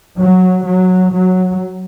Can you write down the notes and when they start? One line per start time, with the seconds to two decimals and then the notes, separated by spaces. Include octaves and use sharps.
0.17 F#3
0.65 F#3
1.11 F#3